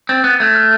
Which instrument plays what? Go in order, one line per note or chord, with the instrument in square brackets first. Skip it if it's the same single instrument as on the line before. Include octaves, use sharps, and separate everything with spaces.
[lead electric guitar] C4 [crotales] A6
[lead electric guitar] B3
[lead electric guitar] A3 [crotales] G#6
[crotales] F6